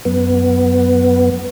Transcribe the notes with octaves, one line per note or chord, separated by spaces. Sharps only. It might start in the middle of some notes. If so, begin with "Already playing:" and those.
F#2 B3